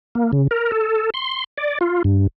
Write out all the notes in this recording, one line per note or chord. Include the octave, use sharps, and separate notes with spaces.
A#3
C#3
A#4
A4
C6
D5
F4
G2